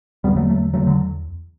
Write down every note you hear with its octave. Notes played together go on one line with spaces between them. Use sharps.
E2 D3 G3 B3
F#3 A3
F#3 A3
E2 D3 F#3 A3
D3 F#3